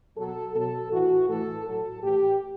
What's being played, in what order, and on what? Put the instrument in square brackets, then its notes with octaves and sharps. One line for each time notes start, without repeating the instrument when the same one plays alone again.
[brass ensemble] B2 F#3 A4
B2 F#3 A4
A2 E3 F#4
A2 E3 A4
A2 F#3 A4
A2 E3 G4